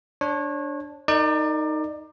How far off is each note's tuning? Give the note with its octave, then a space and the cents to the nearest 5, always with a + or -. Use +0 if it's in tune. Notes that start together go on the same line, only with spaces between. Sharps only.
D4 -5 C#5 -30
D#4 +0 A#4 -40 D5 +25